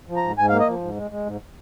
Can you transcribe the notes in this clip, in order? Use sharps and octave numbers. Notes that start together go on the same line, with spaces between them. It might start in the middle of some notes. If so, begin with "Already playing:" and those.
F3
A#5
G#2
G#2 G#5
F5
A#3
D#5
F3
G#2
G#3
G#3
G#2